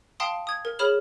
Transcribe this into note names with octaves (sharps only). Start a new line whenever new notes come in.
F5 G5 A5 C6 D#6
D#6 G#6
A#4
G#4 C#5 B5 F6 E7 F#7